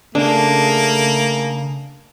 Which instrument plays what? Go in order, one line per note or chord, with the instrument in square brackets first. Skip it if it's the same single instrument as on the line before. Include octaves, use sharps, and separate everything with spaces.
[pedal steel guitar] C#3 G#4 [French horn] A3 [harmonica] A#3 [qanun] D4